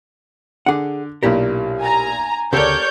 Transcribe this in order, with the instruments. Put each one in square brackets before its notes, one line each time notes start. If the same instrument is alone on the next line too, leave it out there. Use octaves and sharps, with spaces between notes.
[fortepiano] D3 D6 [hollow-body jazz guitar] G#4 F#5
[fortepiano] B1 A#2 D4 [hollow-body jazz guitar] E4 G4 A#4
[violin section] G#5 A#5
[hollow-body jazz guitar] D2 C#3 [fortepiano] G4 A4 A#4 [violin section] C#5 D5 G6